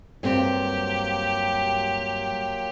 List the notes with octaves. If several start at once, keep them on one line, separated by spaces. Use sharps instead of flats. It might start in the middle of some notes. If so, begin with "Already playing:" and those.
G2 F#3 A#3 C4 F4 G4